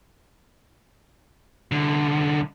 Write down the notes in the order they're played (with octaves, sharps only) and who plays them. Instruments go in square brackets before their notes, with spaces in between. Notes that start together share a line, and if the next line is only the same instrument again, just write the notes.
[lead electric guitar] C2 D3